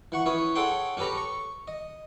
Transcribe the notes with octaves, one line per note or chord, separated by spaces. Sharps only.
E3 F#5 C#6
E3 C#4 B4 C#5 D#6
G#4 A4 C#5 F#5 G5 C6
C#4 G4 A4 B4 A#5
C#6
D#5